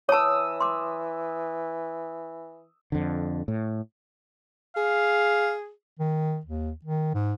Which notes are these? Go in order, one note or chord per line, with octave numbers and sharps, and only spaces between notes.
E3 C#5 A5 D#6 E6
C6 D6
F2 D3
A2
G#4 F5
D#3
D#2
D#3
G#2